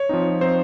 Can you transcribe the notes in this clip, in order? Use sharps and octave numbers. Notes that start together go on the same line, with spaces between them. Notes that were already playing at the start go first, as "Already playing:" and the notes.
Already playing: C#5
F3 C4 D#4
F3 C4 D#4 C5